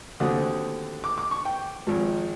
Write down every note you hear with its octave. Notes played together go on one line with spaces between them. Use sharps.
D#2 D3 F#3 A3 C4 D#6
D6
D6
C#6
G5
G#1 G#2 F3